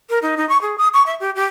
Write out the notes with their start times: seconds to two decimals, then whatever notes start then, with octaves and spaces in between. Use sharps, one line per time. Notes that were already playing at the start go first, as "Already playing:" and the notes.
0.10 A#4
0.22 D#4
0.37 D#4
0.49 C#6
0.62 G#4
0.78 D#6
0.94 C#6
1.06 E5
1.20 G4
1.36 G4